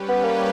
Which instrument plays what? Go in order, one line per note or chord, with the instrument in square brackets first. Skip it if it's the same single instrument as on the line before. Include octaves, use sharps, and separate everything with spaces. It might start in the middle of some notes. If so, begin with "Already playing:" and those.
Already playing: [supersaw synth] G3 C#4 G4 B4
[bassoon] B3
A#3